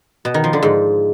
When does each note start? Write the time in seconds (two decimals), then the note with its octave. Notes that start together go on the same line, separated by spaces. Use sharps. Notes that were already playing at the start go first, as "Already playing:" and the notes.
0.25 B2
0.34 D#3
0.44 F3
0.53 D3
0.62 G#2